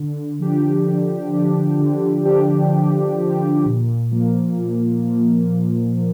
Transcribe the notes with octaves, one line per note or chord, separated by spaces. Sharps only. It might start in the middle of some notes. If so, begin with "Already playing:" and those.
Already playing: D3
F3 D4 G4
D3
F3 D4 G4
D3
F3 D4 G4
D3
F3 D4 G4
A#2
F3 A#3
A#2
F3 A#3
A#2
F3